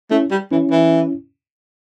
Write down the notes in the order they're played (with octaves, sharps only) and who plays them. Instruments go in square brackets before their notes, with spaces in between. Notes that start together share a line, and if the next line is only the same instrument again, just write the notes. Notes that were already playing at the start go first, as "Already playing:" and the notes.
[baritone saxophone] A3 [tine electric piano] C#4 E4
[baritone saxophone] G3
[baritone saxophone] E3 [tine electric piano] C#4 E4
[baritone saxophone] E3